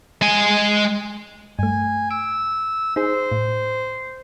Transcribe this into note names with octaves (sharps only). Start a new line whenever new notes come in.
G#3 G#5
G2 A3 G#5
E6 D7
D#4 G#4 C5
A2